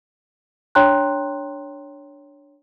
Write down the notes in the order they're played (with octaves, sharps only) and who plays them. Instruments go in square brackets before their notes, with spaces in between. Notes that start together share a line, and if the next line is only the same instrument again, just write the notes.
[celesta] D4 C#5 G5 A#5 C6 F#6